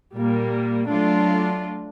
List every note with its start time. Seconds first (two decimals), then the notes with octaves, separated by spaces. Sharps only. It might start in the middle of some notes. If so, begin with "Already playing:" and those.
0.14 A#2 G3 A#3
0.90 F#3 A3 D4 F4